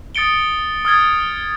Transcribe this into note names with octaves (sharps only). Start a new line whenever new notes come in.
D#6 A6 C#7 D7 G7
D#6 F6 G#6 A6